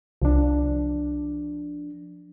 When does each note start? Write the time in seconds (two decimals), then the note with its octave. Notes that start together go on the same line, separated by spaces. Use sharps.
0.22 C2 F3 D4